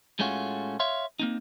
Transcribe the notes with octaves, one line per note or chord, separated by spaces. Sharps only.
A2 G#3 A3 C#4 F4 F#4
C#5 E5 F5 C6
A#3 C4 D#4